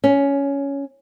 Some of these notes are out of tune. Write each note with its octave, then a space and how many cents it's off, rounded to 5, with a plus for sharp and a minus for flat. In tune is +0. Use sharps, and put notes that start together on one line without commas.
C#4 +10